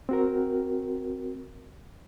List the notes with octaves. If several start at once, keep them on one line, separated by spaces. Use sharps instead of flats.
C4 F#4 A#4